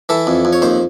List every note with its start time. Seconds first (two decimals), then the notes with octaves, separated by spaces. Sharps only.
0.09 E3 A4
0.27 F2
0.45 F2
0.53 C#5
0.62 D#2 C5